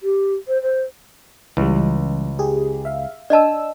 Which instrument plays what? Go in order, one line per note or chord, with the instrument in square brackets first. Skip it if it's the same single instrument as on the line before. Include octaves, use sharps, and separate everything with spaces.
[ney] G4
C5
C5
[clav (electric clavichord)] C#2 [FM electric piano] E3 G3
[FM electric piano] G4 G#4
E5 F5
[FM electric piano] D4 E6 [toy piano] D5 D#5 A5